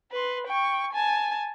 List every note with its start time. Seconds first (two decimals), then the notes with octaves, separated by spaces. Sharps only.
0.12 B4 C6
0.47 G5 C#6
0.93 G#5 A5